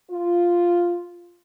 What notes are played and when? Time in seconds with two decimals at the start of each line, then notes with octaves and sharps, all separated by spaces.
0.11 F4